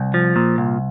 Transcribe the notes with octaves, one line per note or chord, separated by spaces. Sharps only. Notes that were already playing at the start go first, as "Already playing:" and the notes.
Already playing: C2
F3
A#2
C2